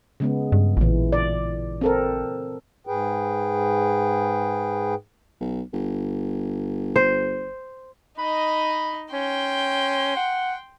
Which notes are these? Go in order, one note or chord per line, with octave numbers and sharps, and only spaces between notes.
C#3 G#3 B3
G2
A1 A#2 E3
D5
C4 A4 A#4
G#2 G#4 B4 G5
B1
G1
C5
D#4 D#5 B5
C#4 G5 C6
F#5